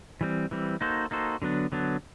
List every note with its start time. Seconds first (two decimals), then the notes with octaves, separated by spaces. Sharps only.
0.21 E3 G3 C4
0.51 E3 G3 C4
0.81 A#3 D#4 F#4 A4 C5
1.11 A#3 D#4 F#4 A4 C5
1.42 D3 F#3 B3 D4
1.72 D3 F#3 B3 D4